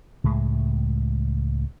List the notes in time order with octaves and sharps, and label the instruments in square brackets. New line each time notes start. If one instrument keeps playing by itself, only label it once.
[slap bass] C#2 A2 G#3